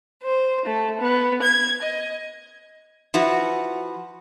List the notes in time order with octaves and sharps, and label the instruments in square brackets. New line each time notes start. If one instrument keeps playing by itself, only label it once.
[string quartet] C5
A3
B3
G#6
D#5
[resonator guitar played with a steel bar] F3 E4 F#4 B4